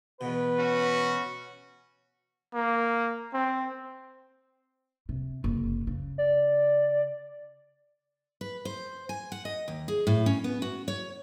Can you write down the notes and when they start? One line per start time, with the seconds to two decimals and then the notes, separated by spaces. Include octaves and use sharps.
0.21 E2 B2 B4
0.59 C#4 F#4
2.54 A#3
3.34 C4
5.09 C3
5.44 F#1 C3
5.87 C#3
6.18 D5
8.41 B4
8.65 C5
9.09 G#5
9.32 F#5
9.45 D#5
9.68 D#2
9.88 G#4
10.07 A2
10.26 C#4
10.44 B3
10.62 F#4
10.88 C#5